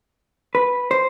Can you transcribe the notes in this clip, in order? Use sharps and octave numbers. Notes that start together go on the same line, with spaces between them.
B4
C5